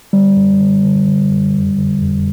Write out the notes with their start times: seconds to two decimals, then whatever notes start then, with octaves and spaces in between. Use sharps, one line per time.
0.13 D3 G3
0.36 F#2
0.60 D3
0.84 D3
1.08 D3
1.30 F#2
1.55 F2
1.78 D3
2.01 F2